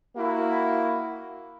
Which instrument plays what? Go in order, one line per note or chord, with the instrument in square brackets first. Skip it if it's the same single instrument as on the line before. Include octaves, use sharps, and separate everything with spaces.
[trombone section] A#3 E4 F#4